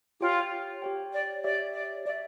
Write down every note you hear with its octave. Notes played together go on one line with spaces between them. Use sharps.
F4 G4 C#5 G5
G4 C#5 G5
D5
G4 C#5 D5 E5
D5
G4 C#5 D5 E5